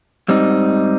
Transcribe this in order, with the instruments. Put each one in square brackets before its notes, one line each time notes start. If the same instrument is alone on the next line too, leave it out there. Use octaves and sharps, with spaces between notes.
[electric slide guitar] G#2 G3 C4 D#4